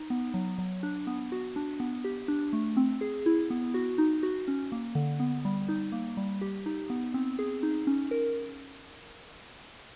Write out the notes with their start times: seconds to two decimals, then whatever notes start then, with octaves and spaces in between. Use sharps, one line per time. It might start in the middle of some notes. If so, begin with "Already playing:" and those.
Already playing: D#4
0.10 B3
0.34 F#3
0.58 F#3
0.83 D4
1.07 B3
1.32 F#4
1.56 D4
1.80 B3
2.04 G4
2.28 D4
2.53 A3
2.77 C4
3.01 G#4
3.26 E4
3.50 B3
3.74 F#4
3.98 D#4
4.23 F#4
4.48 C#4
4.72 A#3
4.95 D3
5.20 B3
5.45 G3
5.69 D#4
5.92 A#3
6.17 G3
6.41 G4
6.66 D#4
6.90 B3
7.14 C4
7.39 G#4
7.63 D#4
7.87 C#4
8.11 A#4